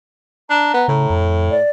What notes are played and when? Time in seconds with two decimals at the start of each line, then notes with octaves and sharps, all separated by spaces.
0.50 D4 A#5
0.74 B3
0.88 A2 C#3
1.10 F2
1.51 D5